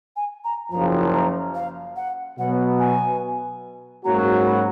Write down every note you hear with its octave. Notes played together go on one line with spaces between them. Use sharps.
G#5
A#5
F#1 F#2 F3 A#5
A#5
F5
F#5
B2 F#3 B3 F#5
G#5
G#2 F#3 A#3 C#4 F#4 A#5
B5